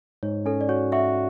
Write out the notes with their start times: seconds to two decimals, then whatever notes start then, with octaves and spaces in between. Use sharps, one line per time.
0.23 G#2 C#5
0.46 C#4 A4
0.61 D5
0.69 F#4 C#5
0.92 F#4 E5